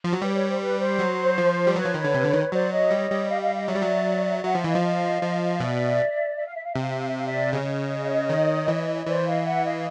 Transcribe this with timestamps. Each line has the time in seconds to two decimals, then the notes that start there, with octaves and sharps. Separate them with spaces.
0.04 F3
0.13 F#3
0.22 G3 B4 C#5
0.34 B4 C#5
0.47 C5
0.60 B4
0.79 C5
0.99 F#3
1.38 F3
1.67 G3
1.76 F#3 B4 C#5
1.85 F3
1.94 D#3
2.04 D3
2.14 C3
2.24 D3
2.33 D#3
2.52 F#3 C5 D5
2.71 C#5 D#5
2.91 G3
3.10 G3
3.29 D#5 F5
3.42 D#5 F5
3.54 D#5 F5
3.68 F#3 D5 E5
3.76 G3
3.82 F#3
4.44 F#3 E5 F#5
4.55 F3
4.64 E3 D#5 F5
4.75 F3
5.22 F3
5.60 B2 D5 E5
6.37 E5
6.46 F5
6.55 E5
6.64 F5
6.72 C3 E5
6.82 F5
6.90 E5
6.99 F5
7.08 E5
7.18 F5
7.26 D5 E5
7.52 C#3 C#5 D#5
8.29 D#3
8.68 E3
9.06 E3 C5 D5
9.25 D#5 F5
9.44 E5 F#5
9.64 D#5 F5